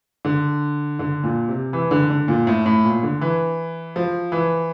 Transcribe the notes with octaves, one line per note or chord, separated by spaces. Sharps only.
D3
D3
A#2
C3
E3
D3
D3
A#2
A2
A2
A#2
D3
E3
F3
E3